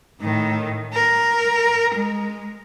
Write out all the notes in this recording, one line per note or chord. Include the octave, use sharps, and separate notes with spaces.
A2 D#3
A#4
G#3